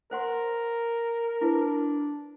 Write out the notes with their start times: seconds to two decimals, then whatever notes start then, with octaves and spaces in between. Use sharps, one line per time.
0.11 A#4 C5 F#5 C6
1.41 D4 E4 B4